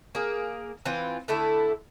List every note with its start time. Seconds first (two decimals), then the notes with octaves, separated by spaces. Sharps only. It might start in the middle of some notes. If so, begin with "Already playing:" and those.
0.15 A#3 G#4
0.85 E3 C4 F4
1.28 D3 A3 E4 A4